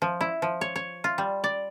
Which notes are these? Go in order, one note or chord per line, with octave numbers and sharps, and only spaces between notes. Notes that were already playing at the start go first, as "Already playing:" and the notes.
F3
E4
F3
C#5
C#5
F4
G3
D5